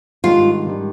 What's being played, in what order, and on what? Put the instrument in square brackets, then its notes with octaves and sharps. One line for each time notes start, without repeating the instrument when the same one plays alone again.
[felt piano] G#2 D#3 G3 D4 [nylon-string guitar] F4
[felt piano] G#2 D#3 G3 D4